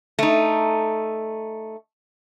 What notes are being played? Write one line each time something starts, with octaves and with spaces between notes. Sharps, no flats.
A3 D#4